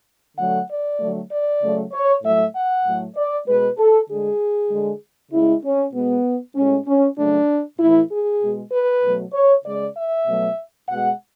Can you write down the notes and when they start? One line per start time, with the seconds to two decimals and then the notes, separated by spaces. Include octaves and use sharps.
0.38 D3 F#3 A3 F#5
0.69 D5
0.99 D3 F#3 A3
1.31 D5
1.61 C#3 F#3 A3
1.93 C#5
2.23 A2 F#3 A3 E5
2.54 F#5
2.85 A2 F#3 A3
3.16 D5
3.47 B2 G#3 B4
3.78 A4
4.08 D3 G#3 G#4
4.70 D3 G#3
5.32 C#3 G#3 E4
5.63 C#4
5.94 B2 G#3 B3
6.56 A2 G#3 C#4
6.86 C#4
7.17 C#3 F#3 A3 D4
7.79 A2 E3 A3 E4
8.10 G#4
8.41 B2 G#3
8.71 B4
9.03 B2 F#3 A3
9.33 C#5
9.64 C#3 G#3 D5
9.96 E5
10.27 B2 F#3 A3
10.88 B2 G#3 F#5